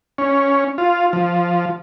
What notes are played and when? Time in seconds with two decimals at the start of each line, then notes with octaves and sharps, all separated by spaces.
0.18 C#4
0.78 F4
1.13 F3